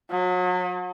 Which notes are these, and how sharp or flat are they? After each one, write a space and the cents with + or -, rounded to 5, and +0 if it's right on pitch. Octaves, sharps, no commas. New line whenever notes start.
F#3 -35